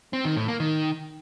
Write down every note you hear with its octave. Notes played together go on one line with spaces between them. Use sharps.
C4
D#3
A2
A#3
D#3